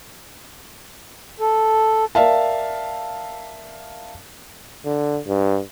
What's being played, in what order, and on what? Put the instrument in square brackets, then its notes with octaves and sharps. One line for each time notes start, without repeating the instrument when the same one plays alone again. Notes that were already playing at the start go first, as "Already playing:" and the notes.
[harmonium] A4
[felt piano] A#4 D5 E5 F5 A5
[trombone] D3
G2